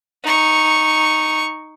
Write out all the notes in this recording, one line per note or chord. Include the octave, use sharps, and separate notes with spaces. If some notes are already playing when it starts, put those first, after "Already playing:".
D#4 C#6